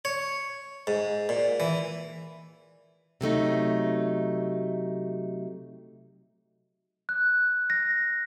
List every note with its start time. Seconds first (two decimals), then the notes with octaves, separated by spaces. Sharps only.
0.05 C#5
0.87 G#2
1.29 A#2
1.60 E3
3.21 C3 F#3 A3 D#4
7.09 F#6
7.70 A#6